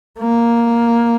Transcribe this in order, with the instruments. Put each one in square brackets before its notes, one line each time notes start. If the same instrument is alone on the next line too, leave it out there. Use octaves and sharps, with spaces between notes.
[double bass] A#3